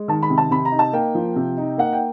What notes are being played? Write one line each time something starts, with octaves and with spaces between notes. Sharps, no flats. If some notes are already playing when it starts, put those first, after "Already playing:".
Already playing: G#3
D#3 A5
B5
C3
A5
C3 B5
A#5
D#4
A5
A#3 G5
F3
C3
D#4
A#3 F#5
G5